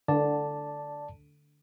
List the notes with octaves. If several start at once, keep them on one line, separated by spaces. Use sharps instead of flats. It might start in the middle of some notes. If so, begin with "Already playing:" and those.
D3 D5 A5